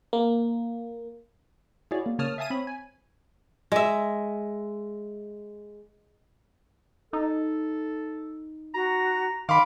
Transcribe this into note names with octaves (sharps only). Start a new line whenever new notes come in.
A#3
E4 F#4 G#4 C#5 D5
A#3
C#3 A#3 C#5 A5 D#6 F6
E5 F5 G#5 A5 D#6 D#7
C4 C#5 B5
G#5
G#3 E5
D#4 A4
F#4 A#5
D#3 F5 B5 C6 D6